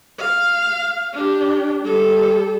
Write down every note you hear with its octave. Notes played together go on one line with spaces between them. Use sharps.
F5
D4 G4
G3 A4